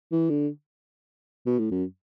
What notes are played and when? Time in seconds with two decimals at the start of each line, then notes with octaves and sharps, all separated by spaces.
0.12 E3
0.30 D3
1.46 B2
1.59 A2
1.71 F#2